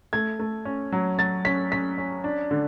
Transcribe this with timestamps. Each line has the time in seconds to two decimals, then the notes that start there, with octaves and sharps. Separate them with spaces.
0.13 A3 G#6
0.39 A3
0.65 C#4
0.92 F#3
1.18 F#3 A6
1.45 C#4 B6
1.71 C#4 B6
1.98 C#4
2.24 D4
2.51 D3